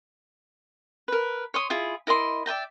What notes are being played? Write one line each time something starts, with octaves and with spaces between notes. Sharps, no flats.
A#4 B4
C#5 C6 D#6
E4 F4 G#4
E4 A#4 D#5 C6
D5 E5 G5 A#5